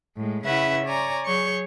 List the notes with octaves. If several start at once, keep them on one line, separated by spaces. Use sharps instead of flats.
A2 G#3
C#3 C#4 E4 B4 E5 F#5
C#5 D5 G#5 A#5
F#3 G#4 C#5 C#6 G6